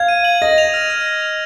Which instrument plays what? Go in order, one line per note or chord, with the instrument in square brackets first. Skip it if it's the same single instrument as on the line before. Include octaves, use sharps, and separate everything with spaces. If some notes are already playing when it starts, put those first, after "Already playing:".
Already playing: [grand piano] F5 [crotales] G#6
[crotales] D#7
F#7
[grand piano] D#5 [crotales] A#6
[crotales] F7
F6
F6
A#6
F7